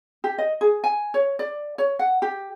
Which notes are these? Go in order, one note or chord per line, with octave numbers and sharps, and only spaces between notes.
G4
D#5
G#4
G#5
C#5
D5
C#5
F#5
G4